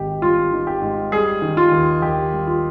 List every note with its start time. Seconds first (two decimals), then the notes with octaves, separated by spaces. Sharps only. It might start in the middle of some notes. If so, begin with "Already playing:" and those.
Already playing: G#1 G#2 D#3 G4
0.22 G3 F4
0.52 D#3
0.67 G4
0.82 G#2
1.12 G3 G#4
1.42 D#3
1.57 F4
1.72 D#2
2.02 D#2 G4
2.33 G3
2.47 F4